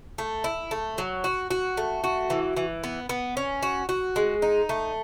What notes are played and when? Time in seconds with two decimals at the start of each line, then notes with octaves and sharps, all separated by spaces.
0.18 A3
0.44 E4
0.71 A3
0.98 F#3
1.24 F#4
1.51 F#4
1.77 A3
2.04 F#4
2.30 E3
2.57 E3
2.84 B3
3.09 B3
3.37 C#4
3.63 F#4
3.89 F#4
4.16 G#3
4.42 D#4
4.69 A3